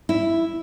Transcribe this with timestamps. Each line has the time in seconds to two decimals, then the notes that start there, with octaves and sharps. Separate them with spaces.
0.09 E4